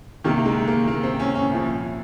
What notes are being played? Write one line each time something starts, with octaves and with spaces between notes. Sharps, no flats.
C2 C3 D#3 A#3
G#3
A#3
A#3
C4
C#4
C#4
C2 A#2 F3